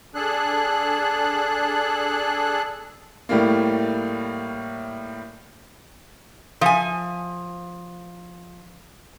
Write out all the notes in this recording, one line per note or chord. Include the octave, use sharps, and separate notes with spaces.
D4 G#4 A4 F#6
A2 G3 A3 A#3
F3 G#5